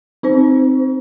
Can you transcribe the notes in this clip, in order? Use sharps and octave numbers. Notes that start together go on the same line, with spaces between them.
C4 D#4 C5